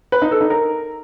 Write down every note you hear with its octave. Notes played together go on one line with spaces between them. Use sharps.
B4
D#4
A4
D#4
A#4